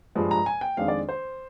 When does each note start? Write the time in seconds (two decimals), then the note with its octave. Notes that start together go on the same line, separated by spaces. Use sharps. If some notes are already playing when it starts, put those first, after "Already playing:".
0.15 G2 F3 G#3
0.31 A#5
0.46 G#5
0.61 G5
0.77 F2 D#3 G#3 D4 F5
0.88 D5
1.09 C5